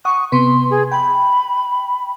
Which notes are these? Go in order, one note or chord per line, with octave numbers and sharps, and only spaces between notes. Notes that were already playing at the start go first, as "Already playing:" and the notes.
F#5 C#6 D#6
C3 B3 B4 C6
G#4
G5 B5